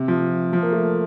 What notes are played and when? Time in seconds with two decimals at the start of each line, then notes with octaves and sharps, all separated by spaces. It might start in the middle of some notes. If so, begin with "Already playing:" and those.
Already playing: C3
0.08 F3
0.53 F3
0.62 A#3
0.73 A3